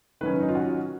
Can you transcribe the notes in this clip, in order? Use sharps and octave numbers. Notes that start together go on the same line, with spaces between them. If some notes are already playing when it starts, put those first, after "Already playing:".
D#3 F#3 C#4 B4
D#4
F4
F#4